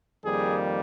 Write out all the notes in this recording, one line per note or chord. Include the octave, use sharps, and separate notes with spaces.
F2 D#3 G3 A#3 G#4